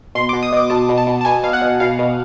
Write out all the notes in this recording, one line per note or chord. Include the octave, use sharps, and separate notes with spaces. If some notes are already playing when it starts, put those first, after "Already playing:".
B2 C6
B2 D6
D#6
B2 D6
B2 A5
B2
A5
B2
A5
B2 G#5
B2 F5
F#5
B2
B2 F5
B2